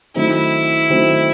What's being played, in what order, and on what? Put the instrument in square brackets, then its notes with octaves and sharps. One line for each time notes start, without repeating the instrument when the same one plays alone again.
[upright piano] D#3 F#3 A3 C4 [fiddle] E4
[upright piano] D#3 F#3 A3 C4